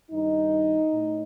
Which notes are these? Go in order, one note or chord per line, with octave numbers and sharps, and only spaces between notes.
G2 D#3 D#4
A2